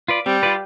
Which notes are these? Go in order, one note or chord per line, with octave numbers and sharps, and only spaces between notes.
F4 B4 D5
G3 C4
F4 B4 D5